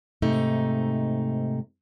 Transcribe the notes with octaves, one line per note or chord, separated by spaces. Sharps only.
G#2 C3 A3 D#4